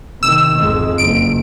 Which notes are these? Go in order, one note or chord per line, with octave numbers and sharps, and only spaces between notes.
C3 D#3 E6
G#1 F2 G#3
F#1 D7